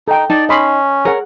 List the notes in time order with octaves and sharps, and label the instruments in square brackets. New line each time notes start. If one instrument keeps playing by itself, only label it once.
[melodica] D#4 [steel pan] A4 G5
[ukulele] D#4 A5 [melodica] D5
[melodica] C#4 [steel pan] D#5 B5 C6
[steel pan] G#4 F#5 [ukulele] A#4 C#5